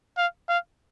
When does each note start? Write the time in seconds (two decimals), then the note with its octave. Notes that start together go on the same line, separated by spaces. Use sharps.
0.18 F5
0.49 F5